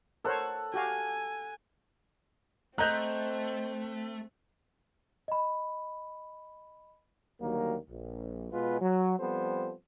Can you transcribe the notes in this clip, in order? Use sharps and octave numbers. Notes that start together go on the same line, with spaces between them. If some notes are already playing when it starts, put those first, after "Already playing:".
A4 A#4 C5 C#5 F#5
F#4 G4 F5 G#5
A3 C4 C5 D#5 A#5 F#6 G6 F7
D#5 B5
D2 D#3 F#3 G3 A#3
A#1
B2 G#3 B3 F4 B4
F#3
F3 G3 B3 C4 A4 C5